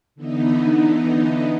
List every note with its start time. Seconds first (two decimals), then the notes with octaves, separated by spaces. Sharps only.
0.15 D3 E3 B3 D#4